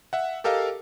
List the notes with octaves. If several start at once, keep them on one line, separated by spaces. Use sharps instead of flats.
E5 F#5
G4 A4 A#4 D#5 F5